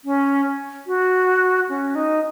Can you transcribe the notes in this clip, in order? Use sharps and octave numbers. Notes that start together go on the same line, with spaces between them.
C#4
F#4
C#4
D#4